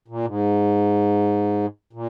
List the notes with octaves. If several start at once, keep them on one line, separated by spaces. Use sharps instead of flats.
A#2
G#2
A#2